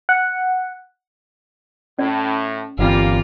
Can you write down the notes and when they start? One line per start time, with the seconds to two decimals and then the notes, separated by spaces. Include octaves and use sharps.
0.09 F#5
1.99 A2 C#4 D5
2.79 G1 E3 G3 A#3 C4 F4